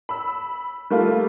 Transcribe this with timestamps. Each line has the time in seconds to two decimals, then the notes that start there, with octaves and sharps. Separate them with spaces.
0.09 B5 E6
0.90 G3 A3 A#3 F4